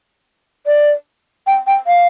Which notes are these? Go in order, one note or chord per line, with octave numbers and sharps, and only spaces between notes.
D5
G5
G5
F5